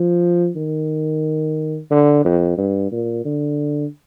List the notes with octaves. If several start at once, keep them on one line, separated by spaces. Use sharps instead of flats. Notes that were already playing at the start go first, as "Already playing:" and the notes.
Already playing: F3
D#3
D3
F2
G2
A#2
D3